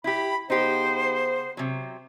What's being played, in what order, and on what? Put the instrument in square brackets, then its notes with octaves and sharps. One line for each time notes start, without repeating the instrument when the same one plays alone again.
[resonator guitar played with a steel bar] E4 G4 [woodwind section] B5
[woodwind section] C#3 B3 C5 [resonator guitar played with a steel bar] D#4 G4
[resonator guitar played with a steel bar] C3 F#3